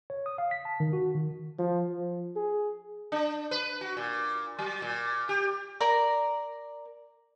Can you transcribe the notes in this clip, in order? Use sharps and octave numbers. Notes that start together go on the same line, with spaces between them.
C#5
D#6
F5
B6
A5
D#3
F#4
D#3
F3
F3
G#4
D4
B4
F#4
A#2
F#3
A#2
G4
A#4 D5 A#5